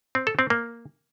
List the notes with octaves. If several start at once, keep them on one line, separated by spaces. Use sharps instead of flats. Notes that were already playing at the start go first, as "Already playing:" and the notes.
C4
A4
C4
A#3